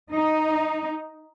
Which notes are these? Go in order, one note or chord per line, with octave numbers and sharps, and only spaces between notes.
D#4